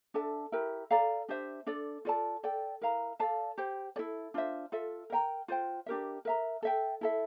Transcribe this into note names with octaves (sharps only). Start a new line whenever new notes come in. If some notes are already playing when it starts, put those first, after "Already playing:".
D4 A4 E5 A5
E4 G4 A#4
A4 D5 F5 A#5
D4 G4 C5 E5
D4 A4 D5
F4 A4 D5 A5
A4 D5 G5
E4 A#4 F5 A#5
A4 D5 F5 A5
G4 C5 G5
E4 A4 D5
D4 F4 C5 E5
F4 A4 E5
A#4 E5 G5 A#5
F4 C5 G5
D4 G4 A#4 E5
A#4 E5 A#5
A4 E5 G5
E4 A4 E5